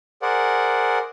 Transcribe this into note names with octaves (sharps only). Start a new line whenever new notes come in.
G#4 A#4 C5 D5 F#5